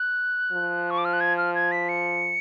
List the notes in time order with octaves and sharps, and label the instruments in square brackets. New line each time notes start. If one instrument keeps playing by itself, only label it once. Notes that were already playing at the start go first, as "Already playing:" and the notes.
Already playing: [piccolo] F#6
[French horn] F3
[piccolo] C#6
D6
F6
F#6
G#6
F6
G#6
B6
C#7